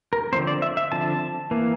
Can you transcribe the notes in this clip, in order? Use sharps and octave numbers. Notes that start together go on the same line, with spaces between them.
A#4
D3 F3 A3 C4 C5
D5
E5
E5
D3 F3 C4 A5
E3 A#3